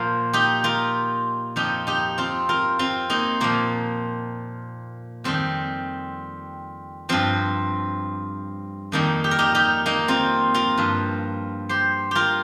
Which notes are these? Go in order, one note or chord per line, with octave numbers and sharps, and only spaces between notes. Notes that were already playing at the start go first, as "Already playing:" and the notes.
Already playing: A#2 F3 F4 A#4 C5
D#4 G4
F4 A#4
F2 F3 D#4 G4
D#4 G4
C4 F4
F4 A#4
C4 F4
A#3 D#4
A#2 F3 A#3
F2 D#3 G3 C4
G2 F3 C4
F2 D#3 G3 A#3 D#4
G4
A#4
D#4 G4
D#4 G4
A#3 D#4
C4 F4
F4 A#4
G2 F3
G4 C5
F4 G4 A#4